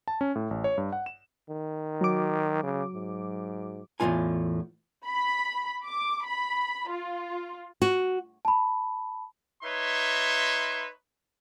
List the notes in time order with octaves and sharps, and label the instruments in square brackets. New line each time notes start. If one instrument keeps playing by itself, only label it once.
[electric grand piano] A5
C#4
A2
A1
C#5
G2
F#5
E7
[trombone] D#3
[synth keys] F#3 D6
[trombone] C#3
G#2
[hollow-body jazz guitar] E2 A2 E3 G#3 F4 G#5
[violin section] B5
D6
B5
F4
[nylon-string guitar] F#4
[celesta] A5 B5
[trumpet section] D#4 B4 C#5 E5 C6